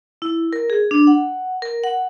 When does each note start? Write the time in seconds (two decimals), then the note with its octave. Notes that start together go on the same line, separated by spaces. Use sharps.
0.22 E4
0.53 A#4
0.70 G#4
0.91 D4
1.07 F#5
1.62 A#4
1.84 F#5